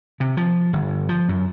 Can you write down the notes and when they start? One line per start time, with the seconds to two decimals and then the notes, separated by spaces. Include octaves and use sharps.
0.20 C3
0.37 F3
0.73 G1
1.09 F3
1.29 F#2